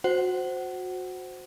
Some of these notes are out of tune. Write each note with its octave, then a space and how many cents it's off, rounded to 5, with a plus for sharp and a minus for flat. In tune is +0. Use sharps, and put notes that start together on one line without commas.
F#4 -20 C5 +0 F#5 +25